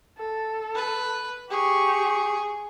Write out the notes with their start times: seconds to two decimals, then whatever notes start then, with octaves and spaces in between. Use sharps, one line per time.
0.18 A4
0.75 B4
1.50 G4 G#4 C#6